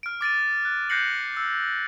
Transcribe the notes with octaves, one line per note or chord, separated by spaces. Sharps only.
F6 D7
D6 A6 D7 D#7
F#6
F#6 G6 A#6 C7 C#7 F#7
E6